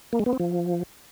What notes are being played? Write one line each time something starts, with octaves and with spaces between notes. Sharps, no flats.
A#3
G#3
B3
C4
F3